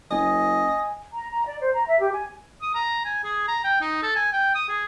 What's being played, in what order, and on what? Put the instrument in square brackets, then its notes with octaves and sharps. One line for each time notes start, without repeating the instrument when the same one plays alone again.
[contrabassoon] F#1 [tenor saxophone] D#5 [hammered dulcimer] G#5
[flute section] A#5
A#5
D5
C5
A#5
E5
G4
G#5
[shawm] D#6
A#5
G#5
G#4
A#5
G5
D#4
A4
G#5
G5
D#6
G#4